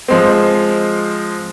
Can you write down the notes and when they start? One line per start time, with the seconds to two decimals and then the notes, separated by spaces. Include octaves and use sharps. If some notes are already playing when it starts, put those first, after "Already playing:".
0.08 F3 G#3 C4